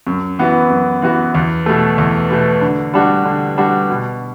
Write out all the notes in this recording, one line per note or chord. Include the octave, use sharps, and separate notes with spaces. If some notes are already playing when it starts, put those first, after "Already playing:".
F#2
E3 B3 F#4
F#2
E3 B3 F#4
E2
B2 A3
E2
B2 A3
D3
G3 D4 F#4
D3
G3 D4 F#4
B2